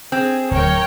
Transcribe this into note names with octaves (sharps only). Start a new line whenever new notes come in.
C4 G#4
D1 A#4 C#5 G5